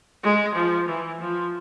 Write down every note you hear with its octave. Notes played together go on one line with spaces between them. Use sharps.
G#3
F3
E3
F3